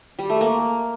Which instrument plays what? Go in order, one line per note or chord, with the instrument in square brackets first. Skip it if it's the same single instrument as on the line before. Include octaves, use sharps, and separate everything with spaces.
[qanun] G3
A3
A#3